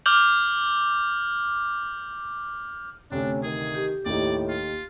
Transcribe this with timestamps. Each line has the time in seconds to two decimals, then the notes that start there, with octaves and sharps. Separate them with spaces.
0.06 D6 F6 G6 F#7
3.12 D2 C3 C#4 D4
3.43 D#3 G#4
3.75 G4
4.06 D#2 A2 D#4 D5
4.49 F4